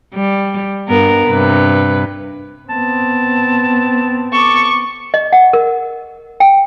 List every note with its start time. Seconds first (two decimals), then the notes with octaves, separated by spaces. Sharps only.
0.15 G3
0.88 G2 B3 A#4
1.27 G2 C3 B4
2.70 B3 C4 A5
4.32 A4 C#6 D6
5.14 D#5
5.33 F#5
5.53 A#4
6.40 G5